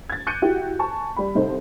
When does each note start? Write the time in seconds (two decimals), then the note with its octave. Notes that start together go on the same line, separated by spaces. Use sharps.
0.10 G#6 A6
0.27 D6 F#6 G6 C#7 D#7
0.42 E4 F#4 G4
0.79 G#5 A5 C#6
1.16 G3 B5
1.35 C2 D#4 A4 C5